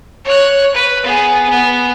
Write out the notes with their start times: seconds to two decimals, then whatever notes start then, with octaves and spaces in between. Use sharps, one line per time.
0.25 C#5 F#6
0.74 B4
1.03 B3 G#4
1.49 B3